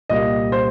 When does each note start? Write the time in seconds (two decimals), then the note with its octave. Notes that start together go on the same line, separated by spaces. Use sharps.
0.10 C2 A#2 G3 A#3 G4 D#5
0.52 C5